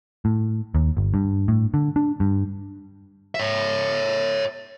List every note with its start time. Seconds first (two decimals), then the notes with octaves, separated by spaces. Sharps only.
0.25 A2
0.75 D#2
0.97 G1
1.14 G2
1.48 A2
1.74 D3
1.96 D4
2.20 G2
3.35 C#5 E5